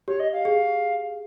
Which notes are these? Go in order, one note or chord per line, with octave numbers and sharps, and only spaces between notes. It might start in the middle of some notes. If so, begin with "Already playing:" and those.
G4 C#5
D#5
F5
G#4